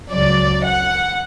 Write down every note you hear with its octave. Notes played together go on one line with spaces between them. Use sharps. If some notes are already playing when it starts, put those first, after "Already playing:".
C#2 C#3 F#3 D5
F#5